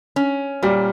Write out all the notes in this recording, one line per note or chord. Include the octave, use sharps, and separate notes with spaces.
C#4
A#2 G3